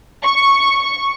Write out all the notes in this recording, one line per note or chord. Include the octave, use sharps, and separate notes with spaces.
C#6